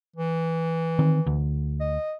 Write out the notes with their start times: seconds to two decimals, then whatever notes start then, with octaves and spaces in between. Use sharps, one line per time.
0.16 E3
0.99 D#3 C4
1.26 D2
1.80 D#5